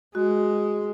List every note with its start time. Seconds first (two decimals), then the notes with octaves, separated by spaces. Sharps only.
0.15 G#3 F#4